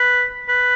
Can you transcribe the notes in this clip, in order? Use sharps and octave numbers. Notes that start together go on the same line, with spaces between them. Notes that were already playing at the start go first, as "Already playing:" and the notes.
Already playing: B4
B4